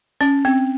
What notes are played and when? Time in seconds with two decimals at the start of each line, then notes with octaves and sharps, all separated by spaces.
0.21 C#4
0.45 C4